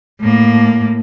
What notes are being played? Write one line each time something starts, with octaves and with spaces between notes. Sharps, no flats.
A2 A#3